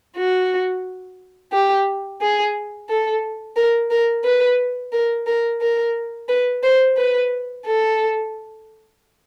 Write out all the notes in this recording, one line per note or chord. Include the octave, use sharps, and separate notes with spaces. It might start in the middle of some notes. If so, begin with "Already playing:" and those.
F#4
G4
G#4
A4
A#4
A#4
B4
A#4
A#4
A#4
B4
C5
B4
A4